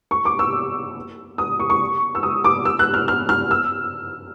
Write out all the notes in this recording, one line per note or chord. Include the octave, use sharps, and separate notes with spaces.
C#6
D6
E6
D#6
C#6
C#6
E6
D#6
D6
E6
F#6
F6
F6
F6
E6